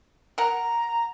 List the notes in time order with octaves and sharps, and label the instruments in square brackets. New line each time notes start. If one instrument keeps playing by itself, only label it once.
[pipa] A#4 F#5 [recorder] A#5